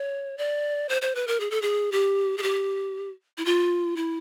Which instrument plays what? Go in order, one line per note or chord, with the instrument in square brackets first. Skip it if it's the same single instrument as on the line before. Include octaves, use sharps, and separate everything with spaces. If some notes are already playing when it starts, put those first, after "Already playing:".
Already playing: [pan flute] C#5
D5
C5
C5
B4
A#4
G#4
A4
G#4
G4
G#4
G4
E4
F4
E4